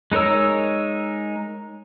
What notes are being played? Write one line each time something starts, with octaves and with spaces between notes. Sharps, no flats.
G#3 D#4 A#4 C#5 E6